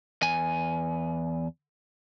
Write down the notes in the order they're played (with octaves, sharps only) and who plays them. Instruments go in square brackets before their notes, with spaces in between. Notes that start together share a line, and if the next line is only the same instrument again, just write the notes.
[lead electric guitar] E2 G#5